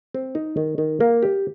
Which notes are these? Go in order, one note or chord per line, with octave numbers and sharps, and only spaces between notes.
C4
D#4
D#3
D#3
A#3
G4